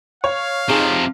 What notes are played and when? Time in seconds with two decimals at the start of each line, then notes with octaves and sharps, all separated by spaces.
0.24 C#5 F5
0.69 C3 F3 D#4 G#4